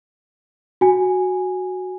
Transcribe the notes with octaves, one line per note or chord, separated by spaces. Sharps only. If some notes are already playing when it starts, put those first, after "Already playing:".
F#4 G#5